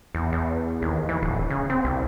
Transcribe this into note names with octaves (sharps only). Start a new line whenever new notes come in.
E2
E2
D#2
E3
D1
C#3
C4
C2